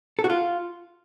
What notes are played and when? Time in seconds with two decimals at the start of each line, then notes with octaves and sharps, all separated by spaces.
0.19 A4
0.24 F#4
0.30 F4